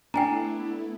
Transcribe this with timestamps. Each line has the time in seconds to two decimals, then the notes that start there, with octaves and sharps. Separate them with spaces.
0.14 A3 B3 D4 E4 G5 G#5 A#5